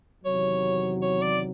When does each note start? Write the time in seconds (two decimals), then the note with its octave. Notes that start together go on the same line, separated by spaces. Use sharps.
0.24 E2 C3 D#3 F#3 C#5
1.02 C#5
1.21 D5